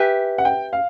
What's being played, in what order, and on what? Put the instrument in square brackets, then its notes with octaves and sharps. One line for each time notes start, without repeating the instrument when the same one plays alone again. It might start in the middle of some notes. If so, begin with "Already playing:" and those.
Already playing: [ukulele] G4 B4 E5 G#5
[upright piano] F#5
G5
F5